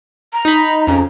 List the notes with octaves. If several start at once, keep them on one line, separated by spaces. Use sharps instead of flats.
A#5
D#4 B5
F2 C#3